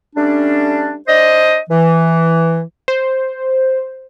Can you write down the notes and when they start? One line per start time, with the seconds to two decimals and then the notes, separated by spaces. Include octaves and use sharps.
0.16 G3 A3 C#4 D4
1.08 D4 C5 D#5
1.70 E3
2.88 C5